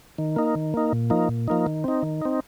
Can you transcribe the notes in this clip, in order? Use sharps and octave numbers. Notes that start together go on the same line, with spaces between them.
D#3
A#3 D#4
D#3
A#3 D#4
A#2
F3 A#3 D#4
A#2
F3 A#3 D#4
D#3
C4 D#4
D#3
C4 D#4